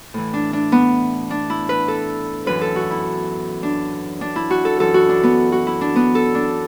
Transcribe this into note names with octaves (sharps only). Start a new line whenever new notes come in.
A2 E3
D4
D4
B3
D4
E4
B4
A4
F#2 E3 B4
A4
F#4
E4
D4
D4
E4
F#4
A4
F#2 E3 A4
F#4
D4
B3
F#4
E4
D4
B3
A4
D4